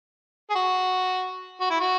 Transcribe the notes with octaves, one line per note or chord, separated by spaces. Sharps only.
G#4
F#4
F#4
E4
F#4